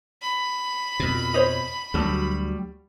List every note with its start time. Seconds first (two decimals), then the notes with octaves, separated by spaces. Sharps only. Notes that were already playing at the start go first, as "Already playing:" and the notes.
0.22 B5
1.00 F2 B2
1.34 C5 C#5 D#5
1.94 D2 F#3 G3 A3